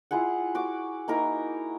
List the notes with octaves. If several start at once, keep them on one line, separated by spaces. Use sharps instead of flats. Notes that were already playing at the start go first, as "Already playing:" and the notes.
E4 F4 G#4 F#5
F#4 D6
A#3 D#4 E4 A#4